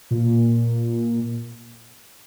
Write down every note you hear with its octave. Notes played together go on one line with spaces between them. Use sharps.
A#2